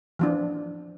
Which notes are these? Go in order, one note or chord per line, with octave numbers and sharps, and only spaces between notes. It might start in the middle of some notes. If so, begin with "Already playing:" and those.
E3 F3 D4